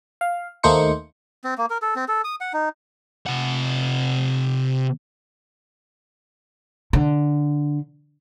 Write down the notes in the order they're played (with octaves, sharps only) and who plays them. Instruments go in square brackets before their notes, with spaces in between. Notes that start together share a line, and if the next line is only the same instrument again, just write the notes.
[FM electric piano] F5
D#2 A3 A#3 D#4 C5 C#7
[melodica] C4
A#3
A#4
A4
C4
A4
D#6
F#5
D#4
[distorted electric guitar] C3 F#5
[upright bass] D3